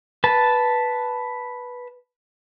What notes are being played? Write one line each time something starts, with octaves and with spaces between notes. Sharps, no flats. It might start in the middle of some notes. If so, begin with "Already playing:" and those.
B4 A5